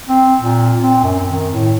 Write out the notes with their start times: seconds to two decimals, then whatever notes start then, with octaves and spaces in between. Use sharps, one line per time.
0.09 C4
0.41 A#2
0.83 C4
1.03 F#2
1.30 D#3
1.52 A2